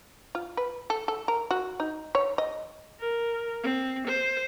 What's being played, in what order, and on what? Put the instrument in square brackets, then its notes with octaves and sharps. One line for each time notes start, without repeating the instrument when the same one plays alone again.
[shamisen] F4
B4
A4
A4
A#4
F#4
D#4
C#5
D#5
[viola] A#4
C4
C5